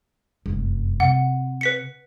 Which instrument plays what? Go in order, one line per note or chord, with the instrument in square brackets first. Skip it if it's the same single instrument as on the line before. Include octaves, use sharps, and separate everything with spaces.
[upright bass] F1 F#2
[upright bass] C3 [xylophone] F#5
[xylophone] B4 B6 C#7